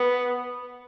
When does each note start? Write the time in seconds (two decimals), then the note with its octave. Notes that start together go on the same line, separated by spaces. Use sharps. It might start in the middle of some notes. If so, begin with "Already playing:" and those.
Already playing: B3